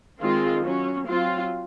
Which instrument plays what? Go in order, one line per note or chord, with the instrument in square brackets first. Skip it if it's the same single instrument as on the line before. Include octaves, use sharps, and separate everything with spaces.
[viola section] D#3 G#3 C4 F4
F#3 C#4
F#3 C4 F4